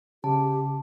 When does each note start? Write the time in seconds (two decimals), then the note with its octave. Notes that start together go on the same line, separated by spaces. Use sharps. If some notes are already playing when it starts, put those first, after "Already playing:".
0.24 C#3 G4 A5